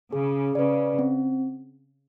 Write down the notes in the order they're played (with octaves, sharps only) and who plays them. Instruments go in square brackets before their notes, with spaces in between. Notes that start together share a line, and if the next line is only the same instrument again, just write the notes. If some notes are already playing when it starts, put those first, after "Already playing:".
[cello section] C#3 [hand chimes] G#4
[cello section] C#3 [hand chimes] B4 D5
[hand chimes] C4